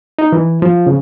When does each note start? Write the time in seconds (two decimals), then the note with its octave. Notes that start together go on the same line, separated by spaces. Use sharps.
0.19 D#4
0.32 E3
0.62 F3
0.87 C#3